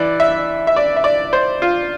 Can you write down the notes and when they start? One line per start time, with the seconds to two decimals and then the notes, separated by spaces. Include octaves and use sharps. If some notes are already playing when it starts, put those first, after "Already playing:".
Already playing: E3 D5
0.20 E5
0.67 E5
0.76 D5
0.96 E5
1.04 D5
1.33 C5
1.62 F4